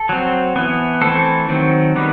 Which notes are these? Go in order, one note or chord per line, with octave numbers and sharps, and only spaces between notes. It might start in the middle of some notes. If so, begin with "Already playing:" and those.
Already playing: A4
F#3 C4
E3 B3
E3 A3 C4 A4
D#3 F#3 C4
D#3 G3 B3